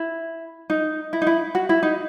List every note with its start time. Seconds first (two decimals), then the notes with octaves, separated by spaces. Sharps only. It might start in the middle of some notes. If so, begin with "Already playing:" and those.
Already playing: E4
0.70 D#4
1.13 E4
1.22 D#4
1.27 E4
1.55 F#4
1.69 E4
1.83 D#4